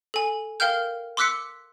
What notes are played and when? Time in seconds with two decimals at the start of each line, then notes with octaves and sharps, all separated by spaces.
0.14 A4 G#5
0.60 A#4 F5 G5 F6 G6
1.17 C6 D6 E6 F#6 B6 C#7